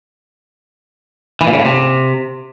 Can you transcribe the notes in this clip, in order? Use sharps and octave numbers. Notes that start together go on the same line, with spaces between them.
E3
A#2
C#3
A2
C3